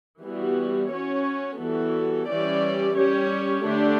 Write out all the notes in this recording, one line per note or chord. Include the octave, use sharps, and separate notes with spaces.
E3 G3 B3 F#4
C#4 F#4 C#5
E3 G3 B3 F#4 A4
E3 G3 C#4 G4 D5
G3 C#4 G4 C#5
D3 A3 D4 G4